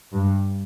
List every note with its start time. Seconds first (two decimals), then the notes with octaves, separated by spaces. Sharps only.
0.12 G2